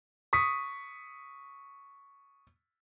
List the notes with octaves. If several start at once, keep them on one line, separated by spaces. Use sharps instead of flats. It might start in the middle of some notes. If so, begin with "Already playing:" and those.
C#6 D#6 B6